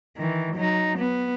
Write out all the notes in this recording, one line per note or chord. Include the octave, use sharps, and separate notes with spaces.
D#3 E3
F#3 D#4
B3